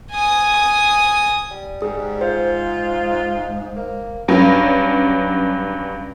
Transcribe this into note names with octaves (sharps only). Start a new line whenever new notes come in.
G#5 D#6
G3
G#2 G#4
F4 C5
A#3
G2 F#3 C#4